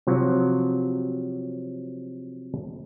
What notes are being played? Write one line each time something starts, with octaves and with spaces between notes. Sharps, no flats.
C3 F3 F#3